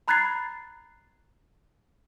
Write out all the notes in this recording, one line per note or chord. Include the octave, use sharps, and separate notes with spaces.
A#5 B5 F#6 G#6 A6 C7